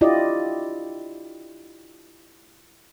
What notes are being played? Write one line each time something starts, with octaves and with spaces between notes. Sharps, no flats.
D4 E4 F4 G4 D5 D#5